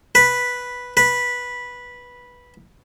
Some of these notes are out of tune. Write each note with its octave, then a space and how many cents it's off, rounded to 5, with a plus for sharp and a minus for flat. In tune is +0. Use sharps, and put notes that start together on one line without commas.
B4 -5
B4 -10